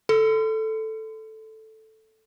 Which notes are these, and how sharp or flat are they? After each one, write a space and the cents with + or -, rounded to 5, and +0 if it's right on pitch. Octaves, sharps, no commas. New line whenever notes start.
A4 +0 C6 -40